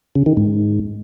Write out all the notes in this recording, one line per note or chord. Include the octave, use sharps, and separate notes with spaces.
C#3
D#3
G#2